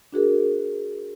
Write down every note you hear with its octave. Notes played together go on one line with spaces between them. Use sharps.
D4 F#4 G#4 A#4